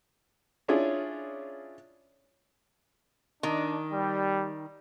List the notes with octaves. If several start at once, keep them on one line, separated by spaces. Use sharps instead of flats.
C#4 D4 E4 F4 G#4 C#5
D#3 D4
G3